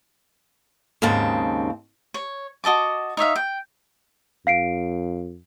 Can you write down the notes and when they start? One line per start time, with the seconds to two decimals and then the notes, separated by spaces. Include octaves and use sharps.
1.02 D#2 G#2 C#3 C4 A5
2.14 C#5
2.64 F#4 D#5 A5 D6
3.17 D#4 C#5 E5 F5
3.36 G5
4.47 F2 F5 C7 D7